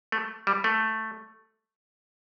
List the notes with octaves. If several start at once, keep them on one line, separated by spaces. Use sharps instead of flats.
A3
G3
A3